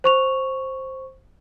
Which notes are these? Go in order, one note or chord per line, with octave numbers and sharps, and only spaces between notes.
C5 C#6 F7